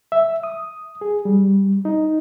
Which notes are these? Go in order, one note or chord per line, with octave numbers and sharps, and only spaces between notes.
E5
D#6
G#4
G3
D#4